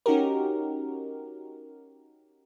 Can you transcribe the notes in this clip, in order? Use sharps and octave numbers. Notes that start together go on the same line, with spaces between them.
C#4 D#4 F#4 G4 A#4